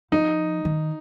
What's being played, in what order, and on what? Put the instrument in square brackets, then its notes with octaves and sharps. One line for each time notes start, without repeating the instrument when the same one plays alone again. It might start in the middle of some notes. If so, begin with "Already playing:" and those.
[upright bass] F3 [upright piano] D#4
[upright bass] D#3